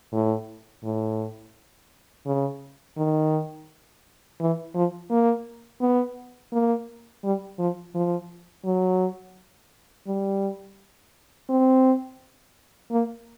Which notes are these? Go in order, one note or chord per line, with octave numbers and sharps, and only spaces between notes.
A2
A2
C#3
D#3
E3
F3
A#3
B3
A#3
G3
F3
F3
F#3
G3
C4
A#3